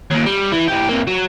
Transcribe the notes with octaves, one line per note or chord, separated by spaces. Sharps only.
D#2 A#2
G3
E3
E3 G4
C3 A#3
F#3